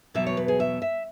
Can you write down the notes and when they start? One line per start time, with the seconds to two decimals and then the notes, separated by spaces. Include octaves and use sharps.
0.14 E2 B2 F#3 E5
0.26 C#5
0.37 B4
0.48 G#4
0.60 E5
0.82 E5